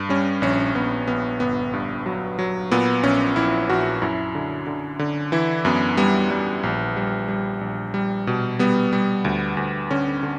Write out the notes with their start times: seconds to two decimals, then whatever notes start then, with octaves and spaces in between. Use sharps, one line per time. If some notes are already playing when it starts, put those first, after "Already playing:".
Already playing: G2
0.09 G3 C#4
0.42 A#1 C#4
0.75 A#1 B3
1.07 A#1 B3
1.40 G1 B3
1.73 G2
2.06 F#3
2.39 F#3
2.71 A#2 B3
3.03 A#1 C#4
3.36 A#1 E4
3.70 A#1 F#4
4.02 F#2 E4
4.35 D3
4.67 D3
4.99 D3
5.32 E3 E4
5.65 F#2 B3
5.97 G3 B3
6.30 G3
6.63 A#1
6.96 G3
7.28 G3
7.61 A#1
7.94 G3
8.27 B2
8.59 G3 B3
8.93 G3
9.25 D2
9.57 D2
9.91 D3 C#4
10.23 D3